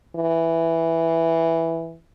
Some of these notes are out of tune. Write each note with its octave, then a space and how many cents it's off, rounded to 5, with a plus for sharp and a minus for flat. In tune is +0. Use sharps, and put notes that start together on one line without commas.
E3 +0